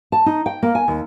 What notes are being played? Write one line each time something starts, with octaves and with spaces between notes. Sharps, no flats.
A5
D#4
G5
A#3
G#5
D#2